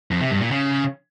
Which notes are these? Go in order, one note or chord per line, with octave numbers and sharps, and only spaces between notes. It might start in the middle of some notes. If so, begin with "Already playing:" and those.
F2
C3
G2
A#2
C#3